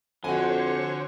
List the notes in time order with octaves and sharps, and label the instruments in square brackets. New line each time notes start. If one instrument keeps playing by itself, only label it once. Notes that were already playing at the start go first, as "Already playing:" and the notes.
[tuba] F2 [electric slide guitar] D3 [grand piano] F#4 G#5 [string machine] C5 C#5 C#6